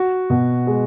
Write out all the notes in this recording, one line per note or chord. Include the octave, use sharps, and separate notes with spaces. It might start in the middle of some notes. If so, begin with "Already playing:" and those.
Already playing: F#4
B2
G#3